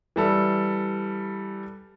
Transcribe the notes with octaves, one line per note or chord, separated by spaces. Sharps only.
E3 G3 A4